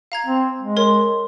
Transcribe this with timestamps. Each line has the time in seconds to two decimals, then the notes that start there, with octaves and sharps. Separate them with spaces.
0.12 F5 A#5 G#6
0.26 C4
0.61 G#3
0.77 A#4 C#5 C6